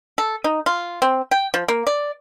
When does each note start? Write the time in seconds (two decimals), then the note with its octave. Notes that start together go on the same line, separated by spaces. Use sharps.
0.18 A4
0.44 D#4
0.66 F4
1.02 C4
1.31 G5
1.54 F3
1.68 A#3
1.87 D5